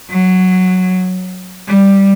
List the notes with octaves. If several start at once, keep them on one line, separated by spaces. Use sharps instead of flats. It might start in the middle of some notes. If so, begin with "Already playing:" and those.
F#3
G3